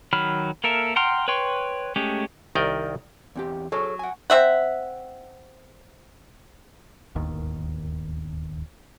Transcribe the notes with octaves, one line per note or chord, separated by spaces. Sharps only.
D#3 F#3 B5 F6
A#3 A4 A#4 E5
F#5 G5 A#5 C6 F6
B4 C#5 G5 C6 C#6
G#3 A3 C#4 G4
C2 D#3 A#4 D5 D#5 G5
E2 C4 G4
F#3 G#4 A4 C#5
F#5 G#5
C4 E5 F#5
D1 G1 D#2 D#3